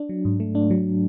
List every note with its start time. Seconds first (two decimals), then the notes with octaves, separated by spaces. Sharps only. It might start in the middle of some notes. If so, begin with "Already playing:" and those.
Already playing: D4
0.09 F#3
0.25 G#2
0.40 A3
0.55 D4
0.71 F#3